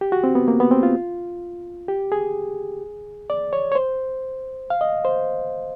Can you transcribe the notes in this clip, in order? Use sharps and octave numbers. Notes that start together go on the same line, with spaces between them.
G4
F#4
C4
B3
A#3
B3
C4
F4
G4
G#4
D5
C#5
C#5
C5
F5
D#5
C5